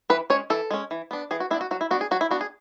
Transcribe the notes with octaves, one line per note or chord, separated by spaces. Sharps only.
E3 B4
G#3 C#4 C#5
E3 A4
G#3 C#4
E3
B3 D4
E3 G#4
F#4
B3 D4 E4
F#4
F#3 F#4
E4
B3 D4 F#4
G#4
F#3 F#4
E4
B3 D4 F#4
G#4